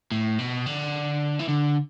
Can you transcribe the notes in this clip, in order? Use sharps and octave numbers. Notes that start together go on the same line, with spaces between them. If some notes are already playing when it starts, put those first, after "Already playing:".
A2
B2
D3
E3
D3